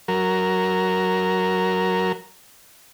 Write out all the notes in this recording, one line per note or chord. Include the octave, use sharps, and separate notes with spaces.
F#3 A#4